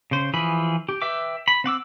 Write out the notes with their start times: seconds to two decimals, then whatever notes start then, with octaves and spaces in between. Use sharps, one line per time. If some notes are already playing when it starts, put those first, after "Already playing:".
0.11 C#3 C5
0.34 E3 F3 G#4 B5
0.89 G4
1.02 B4 E5 G5 D6
1.48 B5
1.64 C4 F#5 D6 E6